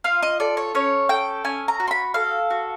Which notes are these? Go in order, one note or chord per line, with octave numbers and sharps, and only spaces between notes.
F4 F5
D#5
A4 D5
C#5
C#4 C#5
A4 G5
C#4 G#5
A#5
F#4
C6
B5
A4 F5
F#4